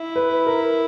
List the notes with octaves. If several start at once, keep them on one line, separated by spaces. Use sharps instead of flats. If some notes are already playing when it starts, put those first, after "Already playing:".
Already playing: E4
B4
A#4